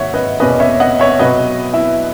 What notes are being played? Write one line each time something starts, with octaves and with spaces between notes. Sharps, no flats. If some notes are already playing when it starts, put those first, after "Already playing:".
Already playing: G#2 D#3 F#3 A#3 C#5 E5 F#5
B4 D#5
E2 B2 A#3 C#4 B4 D#5
C#5 E5
D#5 F#5
C#5 E5
B2 F#3 B3 B4 D#5
E4